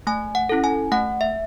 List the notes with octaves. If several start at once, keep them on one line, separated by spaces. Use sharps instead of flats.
A3 G#5
F#5
C#4 E4 A4
G#5
A3 F#5
E5